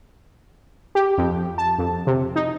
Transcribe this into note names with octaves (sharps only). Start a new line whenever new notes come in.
G4
F2
A5
F2
C3
D#4